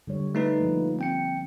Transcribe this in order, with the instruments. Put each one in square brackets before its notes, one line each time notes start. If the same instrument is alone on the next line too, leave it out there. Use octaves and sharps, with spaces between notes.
[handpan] D3 G3 C#5
[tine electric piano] A3 D#4 B4
[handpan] F3 A#3
[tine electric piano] C4 G5 C#7